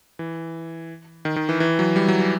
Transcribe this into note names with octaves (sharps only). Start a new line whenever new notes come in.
E3
D#3
D#3
E3
E3
F#3
G3
F#3
E3